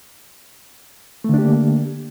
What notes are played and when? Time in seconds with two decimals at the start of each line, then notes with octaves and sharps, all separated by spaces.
1.24 A3
1.29 D3
1.34 D4
1.38 G4
1.43 A#3